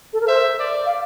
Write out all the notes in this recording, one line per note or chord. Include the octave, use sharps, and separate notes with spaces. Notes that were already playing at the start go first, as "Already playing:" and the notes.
A4
A#4
C5 E5
D5
F5